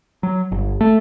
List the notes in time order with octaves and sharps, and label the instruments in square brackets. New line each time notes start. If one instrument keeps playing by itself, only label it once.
[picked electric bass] F#3
G1
A3